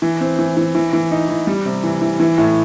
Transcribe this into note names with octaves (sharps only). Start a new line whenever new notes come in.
E3
C4
E3
E3
E3
E3
D#4
E3
G3
C3
E3
E3
E3
A2